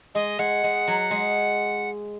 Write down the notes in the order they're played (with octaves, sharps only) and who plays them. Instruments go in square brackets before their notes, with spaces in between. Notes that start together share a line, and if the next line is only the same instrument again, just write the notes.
[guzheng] G#3 [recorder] D#5
[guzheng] G#3 [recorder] F#5
[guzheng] G#3
F#3
G#3